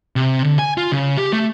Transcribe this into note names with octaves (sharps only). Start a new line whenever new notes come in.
C3
D3
G#5
F4
C#3
G4
A3